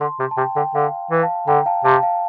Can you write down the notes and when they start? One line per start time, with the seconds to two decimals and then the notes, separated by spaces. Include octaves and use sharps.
0.01 D3 A5 C6
0.19 C3
0.31 A5
0.37 C3 G5
0.55 D3 G5
0.74 D3 F5
1.11 E3
1.23 F5 A5
1.47 D3 G5 A#5
1.66 F5 A5
1.84 C3 F5 A5
2.03 F5